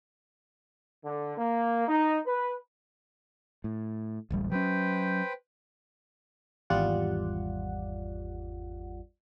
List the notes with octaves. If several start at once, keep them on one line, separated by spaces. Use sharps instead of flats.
D3
A#3
D#4
B4
A2
D1 A1 G3
F#3 C#4 B4 C5 G5
G#1 E2 G3 F4 D5 F#5